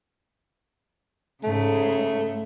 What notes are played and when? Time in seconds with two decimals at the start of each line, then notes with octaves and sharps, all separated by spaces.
1.44 G#2 C#3 A3